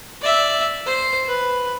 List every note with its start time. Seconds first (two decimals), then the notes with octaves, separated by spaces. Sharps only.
0.22 D5 E5
0.86 C5
1.28 B4